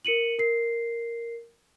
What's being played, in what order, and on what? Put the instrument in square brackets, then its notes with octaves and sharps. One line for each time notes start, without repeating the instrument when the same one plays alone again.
[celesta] A#4 C#7 D#7 F#7
A#4 C7